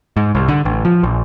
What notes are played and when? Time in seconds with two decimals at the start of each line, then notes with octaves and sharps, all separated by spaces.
0.17 G#2
0.35 C2
0.48 D3
0.65 A1
0.85 F3
1.03 A#1